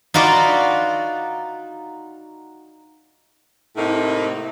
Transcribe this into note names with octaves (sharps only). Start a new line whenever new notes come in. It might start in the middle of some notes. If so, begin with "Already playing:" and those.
D#4 F4 F#4 B4 D5
A2 C3 A3 A#3 D#4